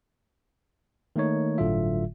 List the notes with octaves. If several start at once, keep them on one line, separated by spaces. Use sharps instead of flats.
D#3 A3 A#3 D#4 C#5
G1 A2 D3 F#3 F4 E5